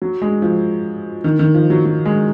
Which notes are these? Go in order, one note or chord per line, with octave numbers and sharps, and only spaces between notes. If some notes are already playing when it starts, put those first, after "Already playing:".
F#3
G#3
F3
D#3
D#3
F3
F#3
F#3
G#3